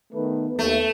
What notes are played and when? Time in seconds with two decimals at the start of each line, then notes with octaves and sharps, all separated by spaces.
0.14 D#3 A3 B3 B4
0.59 D#2 A3